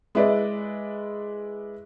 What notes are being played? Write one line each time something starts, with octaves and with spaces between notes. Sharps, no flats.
G#3 E4 B4 D5 D#5